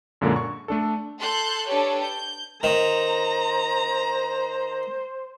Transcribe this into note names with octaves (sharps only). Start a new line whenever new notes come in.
F#2 A#2 D3 G#3 A#3
C#6
A3 D4 A4
A4 C6 F#6 G6
D4 G4 A4 B4 C#5
G6
D#3 C5 A#5